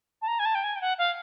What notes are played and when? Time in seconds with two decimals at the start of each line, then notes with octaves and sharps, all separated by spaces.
0.22 A5
0.28 A#5
0.39 G#5
0.45 A5
0.55 G5
0.64 G#5
0.76 G5
0.81 F#5
0.98 F5